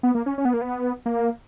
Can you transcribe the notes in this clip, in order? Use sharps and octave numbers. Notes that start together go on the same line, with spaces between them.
B3
A#3
C#4
C#4
B3
A#3
B3
A#3